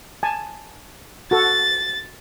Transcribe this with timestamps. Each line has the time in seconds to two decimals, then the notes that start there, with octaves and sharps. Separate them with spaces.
0.23 G#5 A5
1.31 F#4 A4 A6